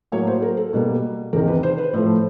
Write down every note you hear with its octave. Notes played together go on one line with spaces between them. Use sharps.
A2 F#3 A#3 C#5
C5
A#4
A4
B2 G3 A#3
E2 C3 D#3 A#4
B4
C5
B4
A2 F3 A3 C5